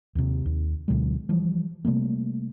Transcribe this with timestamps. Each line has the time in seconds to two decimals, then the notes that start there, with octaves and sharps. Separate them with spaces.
0.15 D#2 C3
0.46 D#2
0.88 D2 B2 F#3 G#3
1.29 E3 F3 G3
1.85 C3 G3 A3 A#3